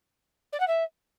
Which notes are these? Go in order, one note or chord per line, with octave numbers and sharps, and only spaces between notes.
D5
F#5
E5